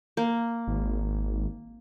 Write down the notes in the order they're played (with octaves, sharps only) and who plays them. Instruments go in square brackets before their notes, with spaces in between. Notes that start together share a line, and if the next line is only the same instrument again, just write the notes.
[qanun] A#3
[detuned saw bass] G#1